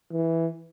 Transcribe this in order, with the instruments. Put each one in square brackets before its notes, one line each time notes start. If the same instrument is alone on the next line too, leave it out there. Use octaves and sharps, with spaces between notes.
[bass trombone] E3